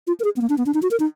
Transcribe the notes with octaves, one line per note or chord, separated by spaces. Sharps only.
F4
A#4
G#4
B3
A#3
D4
B3
D4
D#4
F#4
A#4
D#4